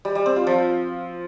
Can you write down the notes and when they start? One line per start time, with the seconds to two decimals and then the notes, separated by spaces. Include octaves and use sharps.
0.05 G3
0.15 G3
0.26 C4
0.36 F4
0.47 F3